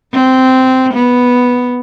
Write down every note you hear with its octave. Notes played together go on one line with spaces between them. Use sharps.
C4
B3